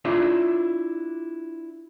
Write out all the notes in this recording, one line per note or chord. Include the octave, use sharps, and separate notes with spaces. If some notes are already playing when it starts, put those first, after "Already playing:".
D4 E4 F4 C#5 E5